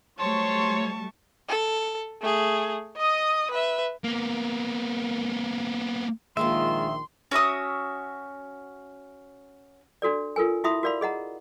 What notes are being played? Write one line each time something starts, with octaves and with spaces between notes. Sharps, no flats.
F#3 G3 A3 C5 C#5 A5 C6 C#6
A4
A3 G#4
D#5 D#6
B4 E5
A#3 B3
A#1 D#3 G#3 A#3 F4 E5 C6
C#4 F#4 E5 D#6
D4 F#4 A4 D5
F4 A4 A#4 G#5
E4 F#4 E5 B5 D#6
F#4 A#4 D5 F5 B5
G#4 D#5 F#5 A#5